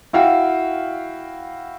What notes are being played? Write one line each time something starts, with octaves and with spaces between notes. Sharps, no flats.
E4 F#4 F5 G5